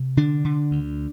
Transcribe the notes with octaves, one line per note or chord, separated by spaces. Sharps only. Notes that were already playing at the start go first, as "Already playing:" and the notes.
Already playing: C3
D3 D4
D3
D2